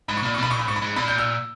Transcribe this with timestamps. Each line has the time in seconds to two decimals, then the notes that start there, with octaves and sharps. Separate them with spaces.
0.08 G#2 B5
0.17 C#6
0.23 A#2 B5
0.34 C#6
0.38 B2 B5
0.51 A#2 C#6
0.59 B5
0.67 G#2 C#6
0.76 B5
0.82 G#2
0.96 A#2 B5
1.08 G6
1.18 E6